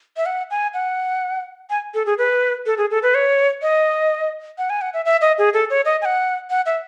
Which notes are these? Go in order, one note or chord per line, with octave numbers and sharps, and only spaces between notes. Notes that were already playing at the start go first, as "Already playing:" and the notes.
E5
F#5
G#5
F#5
G#5
A4
G#4
B4
A4
G#4
A4
B4
C#5
D#5
F#5
G#5
F#5
E5
E5
D#5
G#4
A4
C#5
D#5
G#5
F#5
F#5
E5